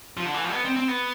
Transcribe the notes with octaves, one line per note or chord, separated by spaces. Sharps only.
F3
D3
E3
F3
B3
C4
C4
B3